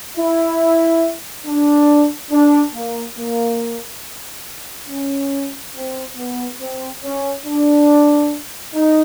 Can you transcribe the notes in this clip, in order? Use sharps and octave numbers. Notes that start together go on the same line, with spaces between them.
E4
D4
D4
A#3
A#3
C#4
C4
B3
C4
C#4
D4
D#4